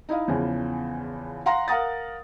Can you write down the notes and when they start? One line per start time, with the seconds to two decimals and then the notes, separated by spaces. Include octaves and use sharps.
0.09 D#4 E4 D#5 F5
0.28 E2 C#3 E3 F3
1.46 F5 F#5 A#5 C6 A#6
1.68 A#4 F5 F#5 A#5 D#6 A6